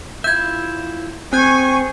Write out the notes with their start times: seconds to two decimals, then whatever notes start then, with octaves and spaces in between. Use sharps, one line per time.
0.24 E4 F4 E5 G6 G#6
1.33 C4 G#4 G#5 C#6 F#6 G6